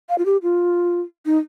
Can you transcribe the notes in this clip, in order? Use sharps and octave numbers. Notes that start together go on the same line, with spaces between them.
F5
F4
G4
F4
D#4